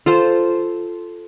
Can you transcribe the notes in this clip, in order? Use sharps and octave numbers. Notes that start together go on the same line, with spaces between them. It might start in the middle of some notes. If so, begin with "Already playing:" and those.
F4 A4 C5